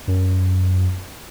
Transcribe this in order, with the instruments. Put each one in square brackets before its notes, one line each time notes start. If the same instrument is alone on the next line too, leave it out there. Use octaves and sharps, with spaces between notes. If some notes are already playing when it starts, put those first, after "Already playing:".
[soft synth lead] F#2